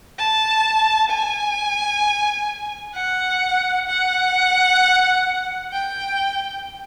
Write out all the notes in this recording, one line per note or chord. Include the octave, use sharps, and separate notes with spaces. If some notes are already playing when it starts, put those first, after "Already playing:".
A5
G#5
F#5
F#5
G5